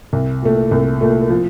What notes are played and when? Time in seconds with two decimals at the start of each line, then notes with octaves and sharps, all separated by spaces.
0.13 C2
0.42 A#2 A3
0.71 C2
1.01 A#2 A3
1.30 F3